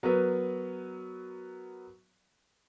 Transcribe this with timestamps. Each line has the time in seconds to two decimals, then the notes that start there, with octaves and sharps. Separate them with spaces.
0.03 F#3 B3 A#4 B4